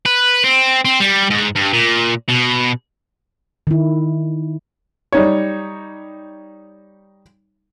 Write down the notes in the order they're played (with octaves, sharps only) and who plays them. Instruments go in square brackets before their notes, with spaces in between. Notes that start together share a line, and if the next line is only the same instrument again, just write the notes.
[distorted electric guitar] B4
C4
C4
G3
G#2
G2
A#2
B2
[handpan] D#3 E4
[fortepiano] G3 D#4 C#5